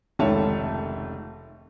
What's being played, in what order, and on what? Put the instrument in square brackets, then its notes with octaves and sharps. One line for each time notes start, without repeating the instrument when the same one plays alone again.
[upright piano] F1 C#2 D#3 A3 C#5 A5